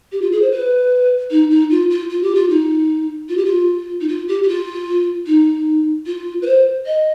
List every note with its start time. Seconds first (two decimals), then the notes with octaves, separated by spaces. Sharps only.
0.12 G4
0.22 F4
0.32 G#4
0.42 C5
0.51 B4
1.31 D#4
1.51 D#4
1.70 F4
1.90 F4
2.10 F4
2.23 G4
2.35 F4
2.50 D#4
3.29 F4
3.37 G4
3.45 F4
4.01 D#4
4.08 F4
4.28 G4
4.43 G4
4.48 F4
5.27 D#4
6.06 F4
6.42 B4
6.47 C5
6.86 D#5